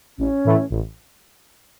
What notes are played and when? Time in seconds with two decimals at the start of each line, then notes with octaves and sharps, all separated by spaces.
0.18 A1 C#4
0.45 A2 E3 A3
0.70 A1